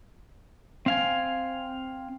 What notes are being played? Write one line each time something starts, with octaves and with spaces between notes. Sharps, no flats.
C4 F5 G#5